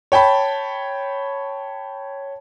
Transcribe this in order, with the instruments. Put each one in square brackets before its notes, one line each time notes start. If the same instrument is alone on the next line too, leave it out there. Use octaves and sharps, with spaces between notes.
[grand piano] C#5 G5 A5 B5